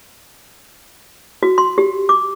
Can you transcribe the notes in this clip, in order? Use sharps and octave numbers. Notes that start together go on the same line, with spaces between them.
F#4
C6
G4
D6